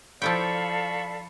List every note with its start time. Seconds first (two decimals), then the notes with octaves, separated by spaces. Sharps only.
0.22 F3 E4 A4 D5 F5 G5 B5 C#6